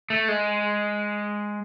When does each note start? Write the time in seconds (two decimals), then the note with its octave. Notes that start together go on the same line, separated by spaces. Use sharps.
0.10 A3
0.28 G#3